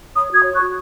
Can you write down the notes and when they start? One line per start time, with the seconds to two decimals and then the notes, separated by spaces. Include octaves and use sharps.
0.15 C#5 B5 D#6
0.31 F#4 D#6 G#6
0.45 C#5
0.55 C#6 F#6
0.60 F#4